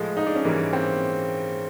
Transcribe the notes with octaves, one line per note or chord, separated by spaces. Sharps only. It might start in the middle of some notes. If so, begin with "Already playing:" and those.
Already playing: A2 F3 G#3
D#4
D4
C#4
G#2 E3 G3 A#3
C4